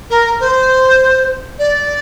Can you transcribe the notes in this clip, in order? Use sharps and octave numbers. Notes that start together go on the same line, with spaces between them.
A#4
C5
D5